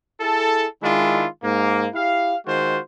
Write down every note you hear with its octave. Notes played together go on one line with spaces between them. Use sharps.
E4 G#4 A4
D#3 G#3 D4 E4 F4
G#2 A#3
E4 G4 F5
D#3 G#3 F4 F#4 C5